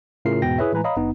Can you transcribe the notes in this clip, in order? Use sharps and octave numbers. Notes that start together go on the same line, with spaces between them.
A2 C#3 A3 F4 A#4 C7
E2 G#2 B2 D#4 G5 A#6
E4 G#4 B4 C#5 E5
A2 E3 G#3 B4 G#5 A#5
C#5 D#5 F5 A#5 B5 D#6
G#1 G2 B3 D#4